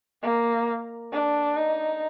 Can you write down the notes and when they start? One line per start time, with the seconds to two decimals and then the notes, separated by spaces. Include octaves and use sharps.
0.22 A#3
1.12 D4
1.57 D#4